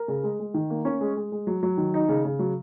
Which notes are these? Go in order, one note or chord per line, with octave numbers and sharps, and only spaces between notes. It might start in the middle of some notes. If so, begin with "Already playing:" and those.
Already playing: A#4
C#3
G#3
G#3
D#3
A#3
C#4
G#3
G#3
G#3
F#3
F#3
D#3
D#4
C#3
C#3
F#3